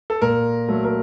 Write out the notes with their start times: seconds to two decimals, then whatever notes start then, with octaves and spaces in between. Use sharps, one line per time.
0.10 A4
0.21 A#2 A#4
0.68 F#3 A3
0.84 A#4